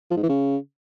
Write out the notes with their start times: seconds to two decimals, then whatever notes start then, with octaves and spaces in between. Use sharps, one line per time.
0.11 F3
0.17 G#2
0.23 E3
0.29 C#3